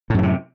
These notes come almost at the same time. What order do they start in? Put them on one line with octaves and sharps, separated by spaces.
A2 F#2 E3 C3